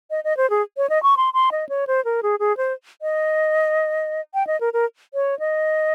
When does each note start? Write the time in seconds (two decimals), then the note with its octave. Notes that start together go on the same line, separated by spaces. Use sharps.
0.10 D#5
0.24 D#5
0.37 C5
0.50 G#4
0.77 C#5
0.90 D#5
1.03 C#6
1.17 C6
1.34 C6
1.52 D#5
1.69 C#5
1.87 C5
2.05 A#4
2.23 G#4
2.40 G#4
2.57 C5
3.02 D#5
4.34 G5
4.47 D#5
4.61 A#4
4.73 A#4
5.14 C#5
5.39 D#5